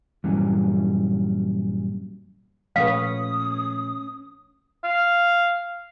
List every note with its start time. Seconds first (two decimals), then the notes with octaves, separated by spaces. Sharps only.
0.24 G2 A#2 E3 F#3 G3 C#4
2.76 A#2 F3 A3 C#4 B4 F5 D#6
4.84 F5